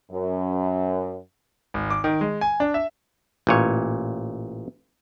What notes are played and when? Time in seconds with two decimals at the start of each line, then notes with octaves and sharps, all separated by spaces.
0.11 F#2
1.74 G#1
1.90 D6
2.04 D#3
2.21 G#3
2.41 G#5
2.60 D4
2.74 E5
3.47 A1 A#2 C#5